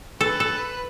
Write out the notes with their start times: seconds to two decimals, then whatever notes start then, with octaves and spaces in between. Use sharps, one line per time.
0.21 A4 B4
0.40 A4